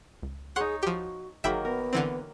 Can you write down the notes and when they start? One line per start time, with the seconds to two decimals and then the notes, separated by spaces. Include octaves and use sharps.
0.23 C#2
0.56 D#4 G#4 C#5 F#5 C6 F#6
0.83 F3 F#4 G4
1.44 G1 D#3 F#3 A#3 G#4 E5 G5 B5
1.65 B3 A#4
1.93 D3 E3 C4